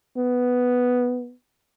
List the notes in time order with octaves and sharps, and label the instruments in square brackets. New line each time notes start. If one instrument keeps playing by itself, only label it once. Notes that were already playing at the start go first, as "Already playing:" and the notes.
[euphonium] B3